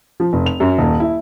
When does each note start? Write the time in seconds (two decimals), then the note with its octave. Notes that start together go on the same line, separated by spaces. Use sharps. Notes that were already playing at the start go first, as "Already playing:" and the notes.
0.20 F3
0.33 F1
0.46 F7
0.60 F#2
0.79 D#1
1.00 E4